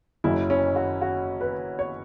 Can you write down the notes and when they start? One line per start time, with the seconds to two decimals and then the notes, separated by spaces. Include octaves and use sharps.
0.24 F#1 F#2 F#3 E4
0.50 C#4
0.76 F#4
1.01 F#4
1.41 B4
1.79 C#5